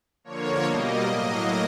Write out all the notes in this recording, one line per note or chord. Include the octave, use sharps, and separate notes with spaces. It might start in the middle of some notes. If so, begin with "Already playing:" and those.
D3 F3 A#3 C#5
B2 G3 A#3 D#5
A2 F#3 A#3 D#5